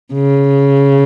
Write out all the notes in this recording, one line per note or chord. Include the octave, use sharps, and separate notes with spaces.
C#3